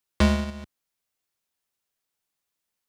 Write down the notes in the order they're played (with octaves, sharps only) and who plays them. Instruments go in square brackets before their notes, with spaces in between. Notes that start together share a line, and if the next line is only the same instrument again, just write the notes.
[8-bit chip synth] D2 G#3